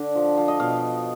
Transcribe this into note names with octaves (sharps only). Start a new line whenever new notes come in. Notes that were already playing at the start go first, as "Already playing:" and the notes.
Already playing: D3
F3
F3
D#5
B2 F5